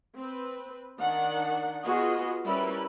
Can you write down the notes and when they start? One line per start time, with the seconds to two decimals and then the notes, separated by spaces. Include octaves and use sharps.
0.17 C4 B4
0.99 D#3 D4 D5 F#5
1.84 B3 F4 F#4 G#4 D#5
2.44 G3 C#4 E4 G4 A#4 B4